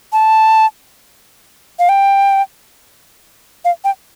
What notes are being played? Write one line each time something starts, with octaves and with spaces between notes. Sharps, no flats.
A5
F5
G5
F5
G5